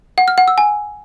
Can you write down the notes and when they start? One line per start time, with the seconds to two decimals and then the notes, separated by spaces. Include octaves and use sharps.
0.18 F#5
0.28 F6
0.38 F#5
0.48 E6
0.58 G#5